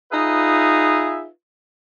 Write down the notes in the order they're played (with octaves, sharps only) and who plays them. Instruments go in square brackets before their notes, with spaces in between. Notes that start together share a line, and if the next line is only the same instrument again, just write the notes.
[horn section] D#4 F4 G#4 B4 E5